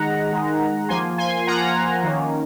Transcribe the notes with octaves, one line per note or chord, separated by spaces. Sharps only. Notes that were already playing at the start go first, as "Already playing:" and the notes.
Already playing: D#3 G#3 D#4 F#5 A#5
D#3 G#3 D#4
F3 A#3 F4 G#5 C6
G#5 C6
F3 A#3 F4 F#5 A#5
D#3 A#3 C#4